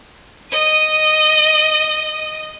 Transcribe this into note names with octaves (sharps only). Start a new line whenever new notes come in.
D#5 D#6